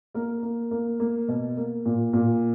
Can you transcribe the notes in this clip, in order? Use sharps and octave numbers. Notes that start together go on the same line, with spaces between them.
A#3 A#4
A#3
A#3
A#3
B2
A#3
A#2
A#2